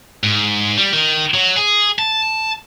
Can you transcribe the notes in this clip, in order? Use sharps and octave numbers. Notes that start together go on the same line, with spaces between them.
G#2
G3
D#3
F#3
G#4
A5